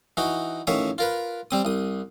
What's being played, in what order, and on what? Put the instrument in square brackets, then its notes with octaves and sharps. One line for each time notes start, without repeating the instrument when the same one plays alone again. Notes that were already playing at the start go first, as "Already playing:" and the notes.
[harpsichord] E3 D#4 F#4
A1 D#3 C#5 E5 F5 D#6
F4 A#4 B4
G3 C4 D#6
C2 D#6